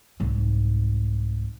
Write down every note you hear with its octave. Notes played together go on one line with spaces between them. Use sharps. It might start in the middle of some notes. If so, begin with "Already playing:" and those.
C2 G#2